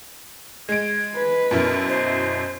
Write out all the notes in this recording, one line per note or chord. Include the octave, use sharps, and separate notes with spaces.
G#3 G#6 D7
B4
F#2 B2 E4 A#4
C5 D#5